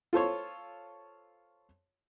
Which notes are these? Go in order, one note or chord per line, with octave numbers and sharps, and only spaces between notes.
F4 A4 C5 C#5